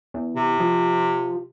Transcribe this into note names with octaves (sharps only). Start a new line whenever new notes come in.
E2
C3
F3